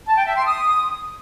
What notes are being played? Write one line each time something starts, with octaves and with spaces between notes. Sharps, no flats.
A5
G5
E5
C6
D#6